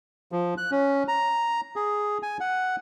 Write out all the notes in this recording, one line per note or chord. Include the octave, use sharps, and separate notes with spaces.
F3
F#6
C#4
A#5
G#4
G#5
F#5